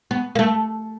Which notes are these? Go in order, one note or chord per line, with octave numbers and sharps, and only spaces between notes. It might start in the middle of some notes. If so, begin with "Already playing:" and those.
B3
A#3
A3